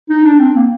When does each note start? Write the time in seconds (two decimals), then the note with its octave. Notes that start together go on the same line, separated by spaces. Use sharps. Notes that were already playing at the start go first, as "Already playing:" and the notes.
0.09 D#4
0.24 D4
0.39 C4
0.56 A#3